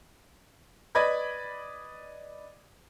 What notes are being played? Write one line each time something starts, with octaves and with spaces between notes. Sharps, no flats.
B4 D5 D#5 B5 G#6